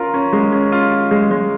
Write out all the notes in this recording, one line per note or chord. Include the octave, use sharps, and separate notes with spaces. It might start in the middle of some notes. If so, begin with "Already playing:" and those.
Already playing: C#4 F4 A#4
C#4
G#3
C#4
F4
F4
G#3
G#3